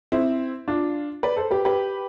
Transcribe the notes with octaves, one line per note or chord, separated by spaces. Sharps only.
C4 E4
D4 F4
B4 D5
A4 C5
G4 B4
G4 B4